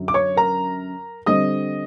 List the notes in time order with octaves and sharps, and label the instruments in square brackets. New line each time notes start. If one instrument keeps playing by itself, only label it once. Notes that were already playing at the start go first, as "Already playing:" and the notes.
Already playing: [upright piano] F#2 D3 F#3
[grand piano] D6
C#5 C#6
A#4 A#5
[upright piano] D3 G3 C4 [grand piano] D#5 D#6